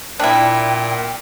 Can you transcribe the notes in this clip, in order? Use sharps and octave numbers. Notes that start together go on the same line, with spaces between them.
A#2 D4 E4 G5